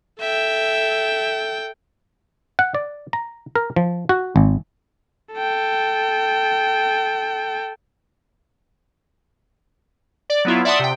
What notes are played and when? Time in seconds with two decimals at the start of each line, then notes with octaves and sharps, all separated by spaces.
0.20 A4 E5 G5
2.59 F#5
2.75 D5
3.13 A#5
3.55 A#4
3.76 F3
4.09 F#4
4.36 G#1
5.34 A4 G5
10.30 D5
10.45 F#3 B3 E4 F4
10.65 D5 E5 F#5 A5 C6 D#6
10.79 C3 G5